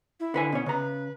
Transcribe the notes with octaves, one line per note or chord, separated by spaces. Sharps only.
E4
D3 B4 G#5
B2 C#4 C#5
C#3 B4 A#5